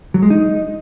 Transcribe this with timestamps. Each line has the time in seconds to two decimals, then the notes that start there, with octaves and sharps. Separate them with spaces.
0.14 F#3
0.22 G#3
0.30 D#4